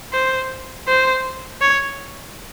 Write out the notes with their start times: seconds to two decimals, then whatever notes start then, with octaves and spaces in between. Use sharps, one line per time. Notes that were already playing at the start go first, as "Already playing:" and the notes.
0.13 C5
0.88 C5
1.61 C#5